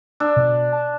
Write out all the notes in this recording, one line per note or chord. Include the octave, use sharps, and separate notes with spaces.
D4 E6
B2
A5